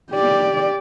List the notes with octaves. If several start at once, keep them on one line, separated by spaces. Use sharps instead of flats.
G4 D5